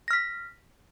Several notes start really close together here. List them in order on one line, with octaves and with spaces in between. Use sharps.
A#6 F6 B6